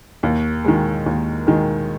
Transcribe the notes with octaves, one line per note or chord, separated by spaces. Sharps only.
D#2
D#3 G#3
D#2
D#3 G#3